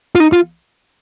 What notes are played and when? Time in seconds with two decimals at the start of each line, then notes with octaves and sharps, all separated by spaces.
0.15 F4
0.20 D#4
0.33 F4